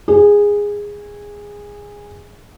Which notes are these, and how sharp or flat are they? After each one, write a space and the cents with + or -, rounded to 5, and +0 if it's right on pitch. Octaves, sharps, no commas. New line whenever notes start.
G#4 -15